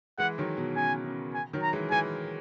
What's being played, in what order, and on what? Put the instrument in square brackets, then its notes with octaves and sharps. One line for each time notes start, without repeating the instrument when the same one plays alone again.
[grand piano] E3 G#3 [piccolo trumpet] F#5
[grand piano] D#3 F#3
B2
[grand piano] C#3 [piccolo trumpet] G#5
[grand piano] C#3
[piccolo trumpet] G#5
[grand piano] D#3 F#3
[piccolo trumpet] A#5
[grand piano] E3 G#3
[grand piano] E3 G#3 [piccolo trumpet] G#5